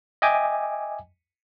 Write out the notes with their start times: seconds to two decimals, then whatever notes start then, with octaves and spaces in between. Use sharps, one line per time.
0.22 D#5 E5 G5 G#5 D6